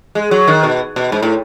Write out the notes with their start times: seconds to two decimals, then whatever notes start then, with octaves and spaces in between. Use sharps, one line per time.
0.15 G#3
0.31 F#3
0.48 D#3
0.63 B2
0.96 B2
1.12 G#2
1.23 A2